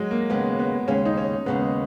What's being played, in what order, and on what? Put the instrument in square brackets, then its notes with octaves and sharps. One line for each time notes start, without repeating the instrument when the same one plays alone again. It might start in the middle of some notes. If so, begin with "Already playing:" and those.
Already playing: [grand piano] F#3 G#3
A#3
[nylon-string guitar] D#2 C#3 G#3 [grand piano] B3
[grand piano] B3
[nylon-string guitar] D#2 C#3 G#3 [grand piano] C#4
[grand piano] D#4
C#4
[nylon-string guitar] D#2 C#3 G#3 [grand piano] B3